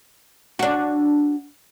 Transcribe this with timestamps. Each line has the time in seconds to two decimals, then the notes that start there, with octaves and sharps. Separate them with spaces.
0.59 D4 F#4